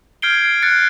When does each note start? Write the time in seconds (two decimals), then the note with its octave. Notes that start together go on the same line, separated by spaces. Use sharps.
0.22 F6 G6 G#6 C7 D7 G7
0.62 F#6 A6 C#7